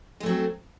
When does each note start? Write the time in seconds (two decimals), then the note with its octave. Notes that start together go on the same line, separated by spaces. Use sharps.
0.20 G#3
0.23 A3
0.26 F#3
0.29 C4